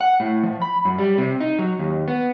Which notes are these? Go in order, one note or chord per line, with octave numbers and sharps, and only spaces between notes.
F#5
A2
F3
B5
F#2
G3
C3
D#4
F#3
D#2
B3